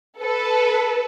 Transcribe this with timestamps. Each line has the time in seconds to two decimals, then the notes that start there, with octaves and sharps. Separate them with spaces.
0.20 A4 B4